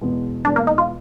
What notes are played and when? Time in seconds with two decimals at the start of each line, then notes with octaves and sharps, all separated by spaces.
0.01 E2 B2 G#3 B3
0.45 E2 B2 G#3 B3 D4
0.56 A#3
0.67 D#4
0.78 F4